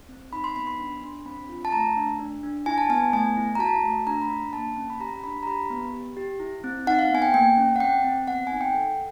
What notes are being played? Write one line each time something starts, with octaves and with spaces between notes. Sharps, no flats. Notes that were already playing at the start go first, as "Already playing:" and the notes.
C4
D#4 B5
C6
B3 B5
C6
D4
D4
C4 B5
F4
A5
A3 A#5
D4
D4
D4
E4 G#5
A5
B3 G#5
A3 G#5
E4
A#5
F#4 A5
A3
D4 A#5
B5
D4
A#3 A5
C#4
B5
G4 A#5
A#5
D4 B5
A#5
G4 B5
B3
G4
G4
E4
C4
D#4 F#5
F5
B3 G#5
G5
A#3 G5
C#4
F#5
C4 G5
C4
B3 F#5
D#4 G#5
G5
A4 F#5